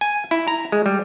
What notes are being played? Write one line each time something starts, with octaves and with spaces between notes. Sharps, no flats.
G#5
E4
A#5
G#3
G3